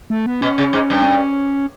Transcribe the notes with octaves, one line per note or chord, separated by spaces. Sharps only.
A3
B3
B2 C#4
C#3
G#2
G2
C4
C#4